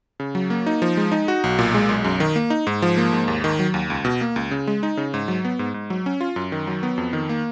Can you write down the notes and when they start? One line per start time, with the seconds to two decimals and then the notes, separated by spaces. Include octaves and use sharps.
0.20 C#3
0.35 F#3
0.50 A#3
0.66 D#4
0.82 F3
0.97 G#3
1.12 D#4
1.28 F#4
1.44 B1
1.59 A#2
1.74 G#3
1.89 B1
2.04 F#2
2.20 D#3
2.36 A#3
2.50 D#4
2.67 G#2
2.82 F3
2.97 A#3
3.12 G#2
3.28 D#2
3.44 D#3
3.59 F#3
3.74 D#2
3.90 C#2
4.05 B2
4.21 A#3
4.36 C#2
4.51 C#3
4.67 G#3
4.83 D#4
4.97 C#3
5.14 G#2
5.28 F#3
5.45 B3
5.59 G#2
5.74 G#2
5.90 F#3
6.06 C#4
6.21 F4
6.36 F#2
6.52 D#3
6.67 F#3
6.83 B3
6.98 F2
7.13 D#3
7.29 A#3